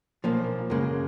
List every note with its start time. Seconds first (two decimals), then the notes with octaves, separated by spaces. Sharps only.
0.24 B1 A#2 F3 A#3
0.70 F#2 C#3 G#3 A#3